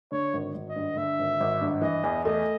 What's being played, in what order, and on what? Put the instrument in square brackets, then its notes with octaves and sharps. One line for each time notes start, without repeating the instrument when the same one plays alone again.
[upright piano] D3 [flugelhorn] C#5
[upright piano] G#1
G#1
[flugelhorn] D#5
[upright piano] G2
[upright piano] D3 [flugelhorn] E5
[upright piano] G#1
G#1
G2
[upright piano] E3 [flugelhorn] D#5
[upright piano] E2
[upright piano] A3 [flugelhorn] D#5